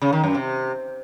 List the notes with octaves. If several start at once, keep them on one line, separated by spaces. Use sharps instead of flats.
C#3
D#3
F#2
C3